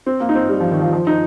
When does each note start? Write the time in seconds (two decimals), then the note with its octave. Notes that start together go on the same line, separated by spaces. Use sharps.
0.06 C4
0.20 A#3
0.29 D#4
0.35 C4
0.49 G3
0.60 F3
0.71 D#3
0.81 F3
0.93 F3
1.07 D#4